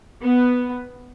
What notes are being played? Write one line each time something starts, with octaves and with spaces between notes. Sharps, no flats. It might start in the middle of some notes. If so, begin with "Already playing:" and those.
B3